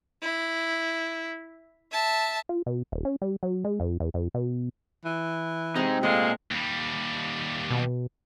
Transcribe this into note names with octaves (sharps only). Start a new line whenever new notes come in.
E4
E5 A5
F4
B2
D#1
C#4
G3
F#3
G#3
F2
E2
F2
B2
E3
C3 G#3 C4 D#4 G#4
A#2 G#3 A3 C5 F5
D#2 G3
B2